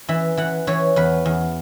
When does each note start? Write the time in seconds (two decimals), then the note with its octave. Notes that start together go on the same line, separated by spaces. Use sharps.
0.09 E3 E5
0.37 E3 F#5
0.67 E3 C#5
0.96 E2 B4
1.26 E2